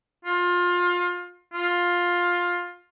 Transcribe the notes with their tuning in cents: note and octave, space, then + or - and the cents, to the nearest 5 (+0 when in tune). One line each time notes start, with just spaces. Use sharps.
F4 +25
F4 +10